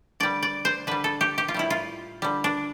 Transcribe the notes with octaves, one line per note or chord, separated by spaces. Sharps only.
D3 G3 D5
D5
C5
D3 G3 B4
A4
G4
G4
F4
A2 G3 E4
F4
D3 G3
D4